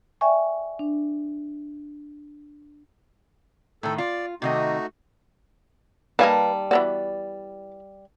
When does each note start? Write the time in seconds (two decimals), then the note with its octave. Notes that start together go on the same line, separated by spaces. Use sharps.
0.21 D5 E5 G5 G#5 C#6
0.79 D4
3.83 A2 D#3 A4
3.98 F4 D5
4.42 C3 D#3 A3 D#4 F#4 D#5
6.19 D#3 G3 A#3 B4 F5 G#5 A5
6.71 E3 B3 F#4 D5